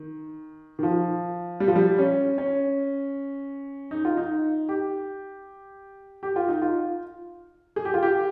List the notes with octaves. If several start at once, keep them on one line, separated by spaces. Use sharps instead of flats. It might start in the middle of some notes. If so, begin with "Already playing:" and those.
Already playing: D#3
D#3
F3
G3
F3
G3
C#4
C#4
D#4
F4
D#4
G4
G4
F4
D#4
F4
G#4
G4
F4
G4